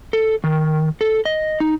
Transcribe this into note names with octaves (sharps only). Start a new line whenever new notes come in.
A4
D#3
A4
D#5
D#4